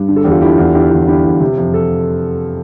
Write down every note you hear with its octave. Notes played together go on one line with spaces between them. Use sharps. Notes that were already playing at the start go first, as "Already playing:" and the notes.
Already playing: G2
D3
A4
E2 G4
F4 A4
D3 E4 G4
E2
D3 E4 G4
E2
D3 E4 G4
E2
C3
F2
A4